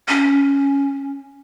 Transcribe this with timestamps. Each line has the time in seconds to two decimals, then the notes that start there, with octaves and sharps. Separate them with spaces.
0.08 C#4